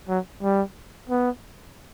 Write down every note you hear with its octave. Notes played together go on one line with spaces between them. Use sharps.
F#3
G3
B3